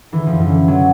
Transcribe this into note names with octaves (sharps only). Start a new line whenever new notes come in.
D3 E3
F#2 F3
E3
D3
D3 F#3